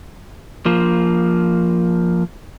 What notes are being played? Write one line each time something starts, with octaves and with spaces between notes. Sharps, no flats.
F3 A#3